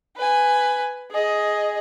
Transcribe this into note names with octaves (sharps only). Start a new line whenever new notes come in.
B4 G#5
G#4 D#5